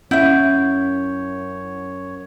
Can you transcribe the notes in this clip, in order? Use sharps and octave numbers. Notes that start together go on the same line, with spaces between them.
F#2 C#4 E4 C#5 E5 F#5 G6